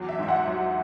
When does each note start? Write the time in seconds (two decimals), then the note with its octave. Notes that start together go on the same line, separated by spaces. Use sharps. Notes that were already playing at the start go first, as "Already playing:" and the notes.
Already playing: E2 F#3
0.09 E5
0.19 G#2 E5
0.28 F#5
0.48 F#3